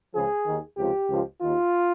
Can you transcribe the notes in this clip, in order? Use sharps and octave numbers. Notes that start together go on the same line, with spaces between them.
C#2 C#3 F3 G#4
D#2 D#3
C#2 C3 F3 G4
C#2 C#3 F3
D#2 D#3 F4